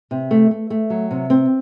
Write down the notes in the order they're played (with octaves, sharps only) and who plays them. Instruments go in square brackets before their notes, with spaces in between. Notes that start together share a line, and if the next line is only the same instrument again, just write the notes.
[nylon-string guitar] C3
A3
A3
A3
F#3
C3
C4